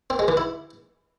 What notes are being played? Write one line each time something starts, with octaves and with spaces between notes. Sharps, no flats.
C4
G#3
E3
E4